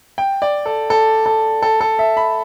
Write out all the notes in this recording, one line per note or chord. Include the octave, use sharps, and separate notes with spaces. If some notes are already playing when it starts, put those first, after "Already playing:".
G5
D5
A4
A4
A4
A4
A4
E5
B5